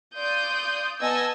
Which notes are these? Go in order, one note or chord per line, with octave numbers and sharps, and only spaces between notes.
D5 F5 C6 D#6 G6
B3 D#5 G#5 A5 E6 G#6